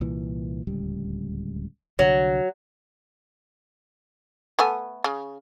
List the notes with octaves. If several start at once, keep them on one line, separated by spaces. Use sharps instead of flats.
C2 A#2 E3
D1 C#2 G3
C2 D3 F#3
A3 B3 G#5
C#3